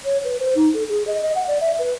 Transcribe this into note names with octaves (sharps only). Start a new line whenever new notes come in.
C#5
B4
C5
D#4
A4
G#4
D#5
D#5
F#5
D5
E5
B4